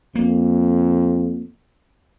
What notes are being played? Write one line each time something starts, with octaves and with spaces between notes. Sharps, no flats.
F2 A#3